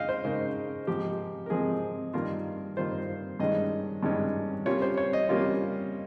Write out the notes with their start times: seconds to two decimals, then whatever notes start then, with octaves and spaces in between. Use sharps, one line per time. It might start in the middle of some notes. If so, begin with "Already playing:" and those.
Already playing: C#3 G#3 D#4 D#5 F5 G5
0.09 C5
0.24 C#3 G#3 D#4 A#4
0.87 G#2 F3 C4 G4
1.46 A#4
1.50 G#2 F3 C4 G#4
2.13 G2 D#3 A#3 F4 A#4
2.77 G2 D#3 A#3 F4 C5
3.40 G2 D#3 G#3 C#4 D#5
4.03 G2 D#3 G#3 C#4
4.66 C3 G3 A#3 C#4 F4 C#5
4.82 C5
4.98 C#5
5.13 D#5
5.29 C3 G3 A#3 C#4 F4